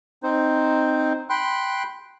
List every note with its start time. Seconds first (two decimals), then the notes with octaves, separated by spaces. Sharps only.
0.23 C4 D#4 C5
1.30 G5 B5 C6 F#6